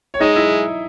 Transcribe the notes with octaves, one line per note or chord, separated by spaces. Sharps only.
C#5
G#3 D#4 D#5
E4 E5